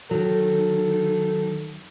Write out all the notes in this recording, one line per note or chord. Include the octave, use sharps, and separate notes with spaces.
D#3 F#3 A4